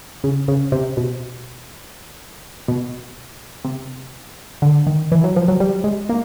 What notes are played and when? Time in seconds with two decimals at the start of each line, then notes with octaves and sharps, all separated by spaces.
0.24 C#3
0.48 C#3
0.72 C3
0.97 B2
2.68 B2
3.65 C3
4.62 D3
4.87 D#3
5.12 E3
5.24 F#3
5.36 F3
5.48 F#3
5.60 G3
5.84 G#3
6.09 A#3